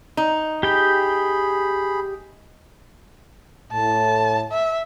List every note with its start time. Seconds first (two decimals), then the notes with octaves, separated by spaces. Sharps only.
0.17 D#4
0.63 G4 G#4 G5 B5
3.72 A2 A5
4.52 E5